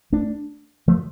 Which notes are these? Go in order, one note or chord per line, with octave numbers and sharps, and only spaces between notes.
A3 D4
F3 A3